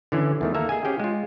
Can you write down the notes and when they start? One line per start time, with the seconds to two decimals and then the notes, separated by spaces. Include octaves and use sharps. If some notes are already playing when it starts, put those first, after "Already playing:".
0.12 D3 E3 C#4
0.41 E2 D#3 A3
0.54 A#3 A4 E5 A#5
0.69 G#4 D#5 G#5
0.85 C4 C#4 G4 G#4 F5 G5
1.00 G#3 F4